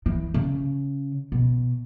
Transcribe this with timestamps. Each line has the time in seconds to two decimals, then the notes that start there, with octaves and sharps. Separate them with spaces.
0.06 E3
0.34 C#3
1.32 B2